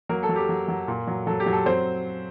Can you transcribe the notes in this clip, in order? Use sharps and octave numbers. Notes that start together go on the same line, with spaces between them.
F#3 A#3 A#4
A4
F#3
G4
F#3
F#3
A#2
F#3
F#3 A4
G4
F#3
A4
F#3 C4 C5